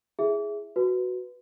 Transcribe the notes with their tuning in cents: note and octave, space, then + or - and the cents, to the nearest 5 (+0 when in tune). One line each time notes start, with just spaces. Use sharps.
E4 +0 G#4 +0 E5 +0
F#4 +0 B4 +0